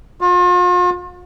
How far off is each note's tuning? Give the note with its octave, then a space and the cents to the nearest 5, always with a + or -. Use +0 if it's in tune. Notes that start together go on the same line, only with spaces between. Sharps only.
F4 +40